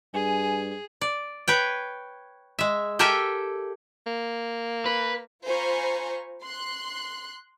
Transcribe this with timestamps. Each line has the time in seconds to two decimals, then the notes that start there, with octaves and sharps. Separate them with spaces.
0.14 G2 G#4 G#5
1.01 D5
1.48 B4 C#5 G5
2.59 G#3 E5
2.99 G4 A4 A#4 E5 G5 G#5
4.07 A#3
4.86 B4
5.46 F4 C5 G#5 A#5 B5 C#6
6.44 C6 F#6